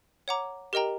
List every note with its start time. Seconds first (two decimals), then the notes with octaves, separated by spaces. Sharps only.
0.28 C#5 F#5 A#5 D6
0.73 G4 A#4 D#5 G5 A#5